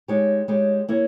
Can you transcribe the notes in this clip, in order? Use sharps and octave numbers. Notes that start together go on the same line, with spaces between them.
G#3 D#4 G4 C#5
G#3 D#4 G4 C#5
A#3 E4 A#4 C#5